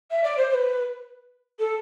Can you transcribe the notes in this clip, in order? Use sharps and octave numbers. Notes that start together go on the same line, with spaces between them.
E5
D5
C5
C5
B4
A4